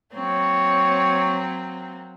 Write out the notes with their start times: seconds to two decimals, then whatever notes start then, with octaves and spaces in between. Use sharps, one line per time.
0.13 F#3 A#3 C4 C#5